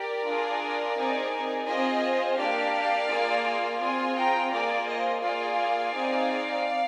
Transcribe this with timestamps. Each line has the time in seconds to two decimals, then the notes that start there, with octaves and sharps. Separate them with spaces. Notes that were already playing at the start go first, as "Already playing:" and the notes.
Already playing: G4 A#4 D5
0.25 D4 F4 G#4
0.97 C4 D#4 G#4
1.68 C4 F4 G#4 C5 D#5
2.38 A#3 D4 G4 D5 F5
3.10 A#3 F4 G#4
3.81 C4 F4 G#4 G#5 C6
4.17 G5 A#5
4.53 A#3 F4 G#4 A#4 D5
4.87 C5 D#5
5.24 A#3 F4 G#4 D5 F5
5.94 C4 D#4 G#4